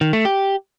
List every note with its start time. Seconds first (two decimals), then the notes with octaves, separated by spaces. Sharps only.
0.01 D#3
0.13 A3
0.25 G4